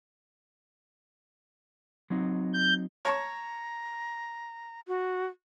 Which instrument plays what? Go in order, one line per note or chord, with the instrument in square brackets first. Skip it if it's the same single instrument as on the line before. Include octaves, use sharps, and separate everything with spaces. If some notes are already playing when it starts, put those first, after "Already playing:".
[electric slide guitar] F#3 C4 D#4
[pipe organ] G6
[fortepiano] C#5 A5 C#6 [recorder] A#5
[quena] F#4